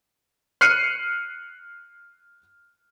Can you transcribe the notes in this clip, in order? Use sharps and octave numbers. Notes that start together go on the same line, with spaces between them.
F6 F#6 C7 C#7 D#7